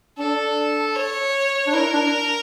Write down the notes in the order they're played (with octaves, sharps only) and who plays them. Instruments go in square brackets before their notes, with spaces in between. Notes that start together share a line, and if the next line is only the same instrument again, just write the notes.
[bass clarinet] D4 [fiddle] A4
[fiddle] C#5
[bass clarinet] D4
[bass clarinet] E4 [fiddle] A#4
[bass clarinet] D4